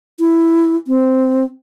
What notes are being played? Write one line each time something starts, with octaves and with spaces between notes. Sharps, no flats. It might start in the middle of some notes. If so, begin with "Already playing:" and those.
E4
C4